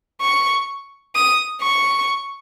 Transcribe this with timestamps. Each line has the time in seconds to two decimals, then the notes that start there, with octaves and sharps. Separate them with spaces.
0.21 C#6
1.15 D#6
1.62 C#6